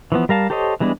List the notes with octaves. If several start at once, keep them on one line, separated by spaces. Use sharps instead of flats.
E3 F3 B3
G3 A#4 F5 A5
G4 A4 C5 C#5 D#5
E3 G3 G#3 B3 D4